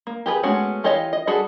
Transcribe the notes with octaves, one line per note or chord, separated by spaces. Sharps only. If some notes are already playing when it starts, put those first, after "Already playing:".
A#3
G4 G#4 A#4 B4
G#3 A3 B3 C#4 F#4
E3 F4 G4 C#5 D#5
D#5
G3 F#4 G#4 A4